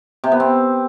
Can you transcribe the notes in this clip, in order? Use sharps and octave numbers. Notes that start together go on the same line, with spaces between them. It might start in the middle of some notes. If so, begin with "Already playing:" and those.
C3
B3
C4